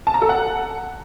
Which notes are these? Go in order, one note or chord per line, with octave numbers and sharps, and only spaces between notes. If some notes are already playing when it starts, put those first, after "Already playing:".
A5
A#5
A4
F#5